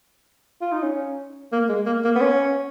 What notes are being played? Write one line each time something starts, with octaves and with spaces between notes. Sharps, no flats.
F4
D#4
C#4
A#3
G#3
A#3
A#3
B3
C#4